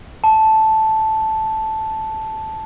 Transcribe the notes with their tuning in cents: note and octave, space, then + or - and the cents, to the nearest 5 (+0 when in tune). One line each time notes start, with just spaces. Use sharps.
A5 -5